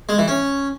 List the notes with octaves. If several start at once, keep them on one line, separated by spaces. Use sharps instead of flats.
G#3
E3
C#4